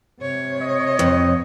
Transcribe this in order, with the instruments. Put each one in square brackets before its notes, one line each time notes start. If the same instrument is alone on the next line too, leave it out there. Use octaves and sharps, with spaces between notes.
[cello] C3 C#5
[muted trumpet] D#5
[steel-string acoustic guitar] F2